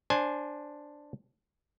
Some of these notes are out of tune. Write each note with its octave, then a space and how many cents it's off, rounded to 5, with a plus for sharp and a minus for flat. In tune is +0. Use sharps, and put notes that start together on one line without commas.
D4 +0 C5 +10 G#5 +20